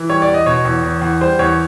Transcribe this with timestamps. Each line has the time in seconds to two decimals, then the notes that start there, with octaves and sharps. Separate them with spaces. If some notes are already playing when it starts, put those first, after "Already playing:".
Already playing: E3
0.09 G3 C#5
0.22 D5
0.28 E2
0.34 D#5
0.46 B2 C#5
0.65 E2
0.83 E2
1.02 E2
1.21 G3 C5
1.39 E2 C#5